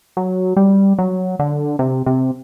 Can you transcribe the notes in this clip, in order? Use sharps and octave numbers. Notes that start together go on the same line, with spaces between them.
F#3
G3
F#3
D3
C3
C3